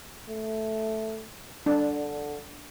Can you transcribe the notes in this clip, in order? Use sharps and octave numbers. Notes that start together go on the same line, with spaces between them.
A3
D3 D4